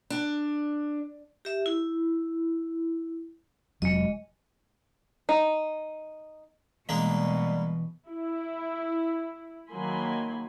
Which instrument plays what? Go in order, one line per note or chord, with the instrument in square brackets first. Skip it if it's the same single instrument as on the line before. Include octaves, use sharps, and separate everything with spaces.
[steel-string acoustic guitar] D4
[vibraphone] G4 E5
E4
[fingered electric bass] F1 F#3 [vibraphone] G#3 D#5
[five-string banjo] D#4
[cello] B2 [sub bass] E3 [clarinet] G3 [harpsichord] G#3 A#3 D4
[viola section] E4
D#3 F#3 A#3 G#5 B5 C6